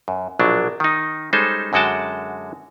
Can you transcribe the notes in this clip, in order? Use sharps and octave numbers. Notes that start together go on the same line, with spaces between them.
F#2
A#1 B2 F#3 D4
D#3 D#4
G3 G#3 C#4 D#4 A4 C5
F#2 D3 G#3 F#4 G5 A5